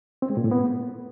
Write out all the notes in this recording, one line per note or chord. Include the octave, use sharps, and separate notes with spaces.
C4
G#3
A#2
A2
B3